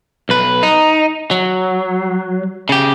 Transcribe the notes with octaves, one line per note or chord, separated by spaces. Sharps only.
B1 B4
D#4
F#3
C#3 G4